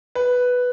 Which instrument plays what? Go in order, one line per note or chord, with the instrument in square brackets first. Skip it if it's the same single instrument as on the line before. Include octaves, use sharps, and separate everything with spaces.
[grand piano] B4